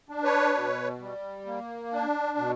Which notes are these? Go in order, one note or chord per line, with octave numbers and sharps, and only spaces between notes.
D4
B4 C#5
B2
G3
A#3
D4
B2